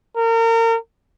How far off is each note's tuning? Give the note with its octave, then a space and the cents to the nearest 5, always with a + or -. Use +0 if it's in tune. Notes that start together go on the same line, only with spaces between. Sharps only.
A#4 -35